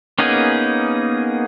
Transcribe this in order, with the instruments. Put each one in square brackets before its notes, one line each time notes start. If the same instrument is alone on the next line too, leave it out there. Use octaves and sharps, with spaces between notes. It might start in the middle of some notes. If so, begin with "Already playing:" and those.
[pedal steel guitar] A#3 B3 C#4 D#4 G#4